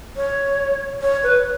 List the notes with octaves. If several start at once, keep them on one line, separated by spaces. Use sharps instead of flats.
C#5
C#5
B4